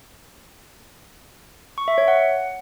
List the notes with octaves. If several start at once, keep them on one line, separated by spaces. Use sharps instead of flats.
C#6
E5
C#5
F#5